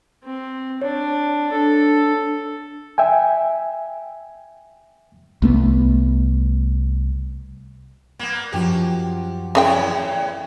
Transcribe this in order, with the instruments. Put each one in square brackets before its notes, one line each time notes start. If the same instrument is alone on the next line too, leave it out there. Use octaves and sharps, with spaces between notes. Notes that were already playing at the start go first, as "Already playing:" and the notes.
[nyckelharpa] C4
[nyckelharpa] D4 [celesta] C#5
[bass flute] D4 [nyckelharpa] A4
[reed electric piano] E5 G5 G#5
[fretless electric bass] C2 A3 B3
[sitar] A#3 B3 [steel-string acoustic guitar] D5
[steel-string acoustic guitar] F#2 F3 F#4 [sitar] G4
[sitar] E2 A2 E4 [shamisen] C#3 D#4 G5